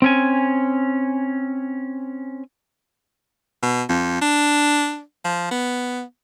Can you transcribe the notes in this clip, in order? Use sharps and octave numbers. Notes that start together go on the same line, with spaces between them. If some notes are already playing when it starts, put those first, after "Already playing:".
C4 C#4 G#5
B2
F2
D4
F3
B3